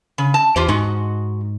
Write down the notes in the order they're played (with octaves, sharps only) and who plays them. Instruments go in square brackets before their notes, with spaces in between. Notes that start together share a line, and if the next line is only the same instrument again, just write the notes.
[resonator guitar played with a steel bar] C#3
A5
[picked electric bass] E2 [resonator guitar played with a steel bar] F4 G4 C5
[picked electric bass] G#2 [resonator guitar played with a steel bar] G#3 D#4 F#4